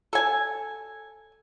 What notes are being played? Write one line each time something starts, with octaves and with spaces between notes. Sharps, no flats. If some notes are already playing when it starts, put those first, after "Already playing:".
A4 G#5